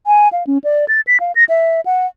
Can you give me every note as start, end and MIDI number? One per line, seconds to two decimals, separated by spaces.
0.07 0.28 80
0.32 0.46 77
0.47 0.58 61
0.64 0.85 74
0.88 1.01 93
1.07 1.17 95
1.20 1.32 77
1.36 1.44 94
1.49 1.81 76
1.86 2.06 78